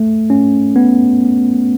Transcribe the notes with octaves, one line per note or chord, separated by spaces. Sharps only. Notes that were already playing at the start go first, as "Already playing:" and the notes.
Already playing: A3
C#4
B3